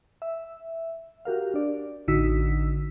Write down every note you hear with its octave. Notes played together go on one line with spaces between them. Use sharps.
E5
F#4 G4 A#4 F5
D4 D5
A1 D3 D#4 F#4 E6 B6